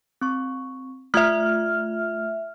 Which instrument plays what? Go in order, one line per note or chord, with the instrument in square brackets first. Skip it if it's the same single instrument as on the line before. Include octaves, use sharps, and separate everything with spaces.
[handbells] C4 C#6
[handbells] A3 F4 G#6 [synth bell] E5 F6